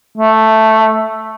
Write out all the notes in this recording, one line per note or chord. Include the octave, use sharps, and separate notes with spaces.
A3